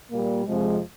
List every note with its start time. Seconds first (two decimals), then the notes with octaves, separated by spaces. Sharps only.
0.11 A#2 G3 A#3
0.45 F2 C3 F3 G#3